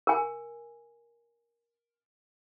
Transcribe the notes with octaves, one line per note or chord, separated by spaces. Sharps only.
A#4 G#5